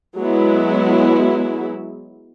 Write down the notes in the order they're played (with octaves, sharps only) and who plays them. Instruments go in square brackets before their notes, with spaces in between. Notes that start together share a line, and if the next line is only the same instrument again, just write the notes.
[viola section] F#3 G#3 B3 E4